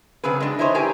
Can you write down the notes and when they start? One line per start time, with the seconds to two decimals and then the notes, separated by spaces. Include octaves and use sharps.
0.24 C#3 F#3 C4 G#4 B4
0.40 G#3 D4
0.59 D#4 E4 G#4 C5 C#5 D#5
0.75 G4 G#4 A#4 B4 G#5